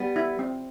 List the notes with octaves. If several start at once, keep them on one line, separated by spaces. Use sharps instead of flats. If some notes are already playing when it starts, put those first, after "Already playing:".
Already playing: G3 B3
E4
C4